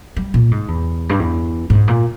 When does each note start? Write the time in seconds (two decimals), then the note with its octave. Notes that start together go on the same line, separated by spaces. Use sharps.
0.16 G3
0.34 A#2
0.51 G#2
0.68 E2
1.09 G2
1.19 E2
1.70 G#2
1.88 A#2